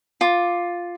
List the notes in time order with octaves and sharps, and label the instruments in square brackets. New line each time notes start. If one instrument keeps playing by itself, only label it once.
[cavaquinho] F4 D6